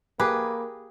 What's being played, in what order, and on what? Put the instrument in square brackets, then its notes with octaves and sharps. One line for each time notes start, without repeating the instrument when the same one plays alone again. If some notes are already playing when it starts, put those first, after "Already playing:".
[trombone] A#3 [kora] G4 G#4 [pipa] B4